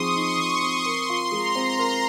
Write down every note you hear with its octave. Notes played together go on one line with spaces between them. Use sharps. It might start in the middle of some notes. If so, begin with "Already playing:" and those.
Already playing: F3 C4 D#4 G#4 C6 C#6 D#6
D#4
F3
C4
A#4 C6
F4
G#3 A#5
C4
A#4